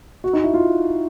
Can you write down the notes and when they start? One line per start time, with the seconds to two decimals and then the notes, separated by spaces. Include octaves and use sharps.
0.24 F#4
0.33 D#4
0.44 E4
0.54 F4